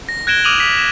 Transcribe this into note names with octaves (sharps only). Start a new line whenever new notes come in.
A#6
F#6 G#6 A#6 D7 E7 G7
D6 D#6 F6 D#7 F7 F#7
B6
E7